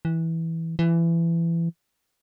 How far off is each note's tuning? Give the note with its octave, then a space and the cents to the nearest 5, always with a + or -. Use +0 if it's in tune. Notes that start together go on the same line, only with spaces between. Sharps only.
E3 -10
E3 +25